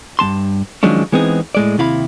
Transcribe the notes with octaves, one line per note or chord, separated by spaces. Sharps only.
G2 A#3 A5 C6
D#3 F3 F#3 G#3 C#4 D4
E3 G#3 B3 C4 D#4 G#4
A2 G#3 D5
D#2 C3 E4 F5 B5